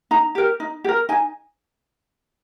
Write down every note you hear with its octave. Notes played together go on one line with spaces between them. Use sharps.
D#4 A#5
G4 A#4
D#4
G4
A#4
D#4 G#5